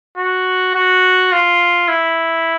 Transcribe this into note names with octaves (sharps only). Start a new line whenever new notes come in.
F#4
F#4
F4
E4